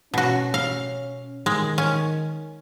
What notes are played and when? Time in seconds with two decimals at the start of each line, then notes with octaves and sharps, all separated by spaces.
0.14 B2 C#4 F#4
0.54 F5
1.46 D#3 G#3
1.78 C#4